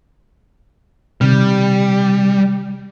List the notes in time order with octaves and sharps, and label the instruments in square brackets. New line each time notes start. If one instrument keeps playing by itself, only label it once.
[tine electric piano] C3 D#3 F6 [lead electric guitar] G3